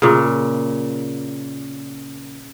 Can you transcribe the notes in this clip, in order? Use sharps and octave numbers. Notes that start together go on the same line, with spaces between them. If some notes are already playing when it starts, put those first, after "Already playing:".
A#2 C#3